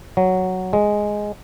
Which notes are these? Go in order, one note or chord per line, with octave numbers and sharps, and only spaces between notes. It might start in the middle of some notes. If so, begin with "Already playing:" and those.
F#3
G#3